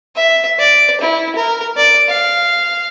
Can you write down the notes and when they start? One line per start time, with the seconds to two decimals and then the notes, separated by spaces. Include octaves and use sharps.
0.16 E5
0.59 D5
1.01 E4
1.36 A#4
1.77 D5
2.09 F5